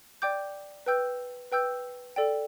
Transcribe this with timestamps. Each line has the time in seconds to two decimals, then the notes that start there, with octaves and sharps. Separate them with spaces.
0.22 D5 G5 D6 G6
0.86 B4 G5 E6 G6
1.52 B4 G5 E6 G6
2.16 A4 D5 G5